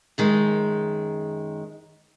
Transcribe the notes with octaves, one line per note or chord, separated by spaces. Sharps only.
F#2 D#3 G#3